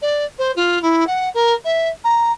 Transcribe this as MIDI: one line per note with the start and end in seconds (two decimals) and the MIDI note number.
0.01 0.25 74
0.38 0.51 72
0.56 0.81 65
0.82 1.04 64
1.06 1.29 78
1.34 1.54 70
1.64 1.88 76
2.04 2.32 82